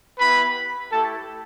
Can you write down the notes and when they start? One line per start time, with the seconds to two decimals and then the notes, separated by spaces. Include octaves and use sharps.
0.19 B3 E4 G4 B4 B5
0.91 A3 E4 G4 A4 A5